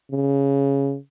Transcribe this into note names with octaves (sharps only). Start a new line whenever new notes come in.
C#3